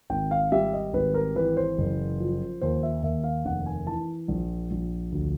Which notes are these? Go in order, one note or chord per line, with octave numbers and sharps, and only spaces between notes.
G#1 G5
F5
G3 E5
D#5
G#1 B4
A#4
E3 B4
C5
F#1
F3
D#2 C5
E5
D#2 E5
F5
F1 F#5
G#5
E3 A5
A#1
A#1
D2